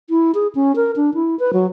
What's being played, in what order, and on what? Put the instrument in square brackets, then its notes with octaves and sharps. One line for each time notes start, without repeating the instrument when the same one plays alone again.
[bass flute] E4
G#4
C#4
A#4
D4
E4
B4
F#3